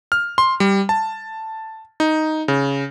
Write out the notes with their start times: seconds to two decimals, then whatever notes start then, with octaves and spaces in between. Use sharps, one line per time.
0.12 F6
0.38 C6
0.60 G3
0.89 A5
2.00 D#4
2.48 C#3